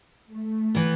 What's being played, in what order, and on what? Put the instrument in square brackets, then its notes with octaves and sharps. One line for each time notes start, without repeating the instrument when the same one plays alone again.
[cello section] A3
[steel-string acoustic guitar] E3 B3